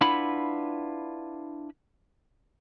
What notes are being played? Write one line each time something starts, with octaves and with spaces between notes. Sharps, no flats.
D4 E4 F4 B4 F#5 B5